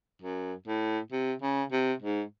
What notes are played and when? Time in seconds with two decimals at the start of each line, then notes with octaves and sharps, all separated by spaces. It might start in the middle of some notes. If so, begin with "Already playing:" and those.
0.22 F#2
0.67 A2
1.12 C3
1.42 C#3
1.72 C3
2.02 G#2